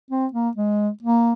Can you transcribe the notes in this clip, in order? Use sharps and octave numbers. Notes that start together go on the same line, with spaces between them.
C4
A#3
G#3
A#3